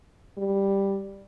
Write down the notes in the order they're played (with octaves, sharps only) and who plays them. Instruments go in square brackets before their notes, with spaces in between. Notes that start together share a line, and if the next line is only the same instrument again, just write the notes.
[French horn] G3